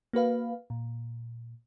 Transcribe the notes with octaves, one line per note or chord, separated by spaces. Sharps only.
A#3 F#4 B4 F5
A#2